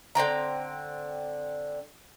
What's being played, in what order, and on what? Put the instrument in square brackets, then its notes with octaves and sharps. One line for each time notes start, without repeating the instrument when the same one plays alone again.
[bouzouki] D3 C4 G5 A#5